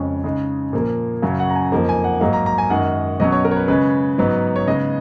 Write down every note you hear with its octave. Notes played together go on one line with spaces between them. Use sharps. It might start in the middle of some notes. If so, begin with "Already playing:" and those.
Already playing: F2 C#3 G#3 C#4 C#5
C#3 G#3 D#4 D#5
A#2 F3 A#3
F#2 C#3 F#3 C#4 F5
F#5
A#5
G#5
F2 F3 A#3 D#4
G#5
F#5
G#2 F#3 A#3 D#4 F5
A#5
A#5
G#5
F#2 D#3 G#3 D#4 F#5
B2 F#3 C#4 D#5
C#5
A#4
C#5
B4
C#3 G#3 C#4 B4
G#2 F#3 B3 D#4
C#5
C#3 G#3 B3 D#4 D#5